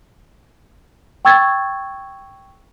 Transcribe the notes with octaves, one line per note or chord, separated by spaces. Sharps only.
G5 C#6 E6 G#6 A6